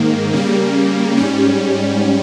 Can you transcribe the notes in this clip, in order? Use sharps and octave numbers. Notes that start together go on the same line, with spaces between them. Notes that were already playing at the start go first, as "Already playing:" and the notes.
Already playing: G#2 D#3 A#3
C#3 G3 A#3
G#2 G3 C#4